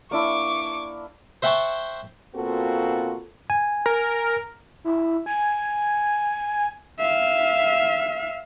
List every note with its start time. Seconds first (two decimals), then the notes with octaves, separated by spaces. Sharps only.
0.11 A#3 D4 E4 C#6 D6
1.42 C5 E5 F#5 G5 A5 C#6
2.35 B2 A#3 C4 F4 F#4 A4
3.50 G#5
3.86 A#4
4.84 E4
5.26 G#5
6.99 E5 F5